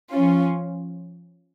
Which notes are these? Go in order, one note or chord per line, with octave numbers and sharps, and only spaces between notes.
F3 C#4 F4